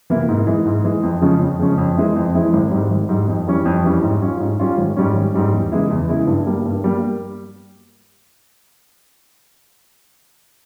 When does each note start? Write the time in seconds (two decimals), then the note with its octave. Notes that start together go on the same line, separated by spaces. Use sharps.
0.10 C3 E3 A#3 E4
0.29 G#2
0.47 E3 G#3
0.66 G#2
0.84 E3 G#3
1.03 F2
1.22 C#3 F3 G#3 C#4
1.40 F2
1.59 C#3 F3 G#3 C#4
1.78 F2
1.97 E3 G#3 C4 E4
2.16 F2
2.35 E3 G#3 C4 E4
2.53 G#1
2.71 G#2 G3
2.90 G#1
3.09 G#2 G3
3.28 F2
3.47 E3 G3 C#4
3.65 F2
3.84 E3 G3 C#4
4.02 G#2
4.22 G3 C#4 F4
4.40 G#2
4.59 G3 C#4 F4
4.78 G#1
4.96 G#2 G3 C#4
5.15 G#1
5.34 G#2 G3 C#4
5.53 E2
5.71 C#3 E3 G#3 E4
5.90 E2
6.09 C#3 E3 G#3 E4
6.27 G2
6.46 G3 A#3
6.65 G2
6.84 G3 A#3